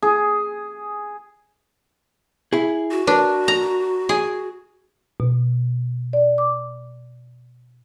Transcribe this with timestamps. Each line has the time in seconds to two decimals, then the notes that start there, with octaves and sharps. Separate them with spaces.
0.02 G#4
2.53 E4 G#4
2.91 F#4
3.07 D4 A#4 B4
3.48 A#5
4.09 G#4
5.20 B2
6.13 D5
6.38 D6